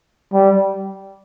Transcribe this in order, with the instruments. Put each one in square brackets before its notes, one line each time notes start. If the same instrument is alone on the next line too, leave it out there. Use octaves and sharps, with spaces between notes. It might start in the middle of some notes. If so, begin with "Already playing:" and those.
[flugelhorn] G3